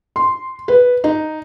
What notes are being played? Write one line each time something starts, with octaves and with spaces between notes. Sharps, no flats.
C6
B4
D#4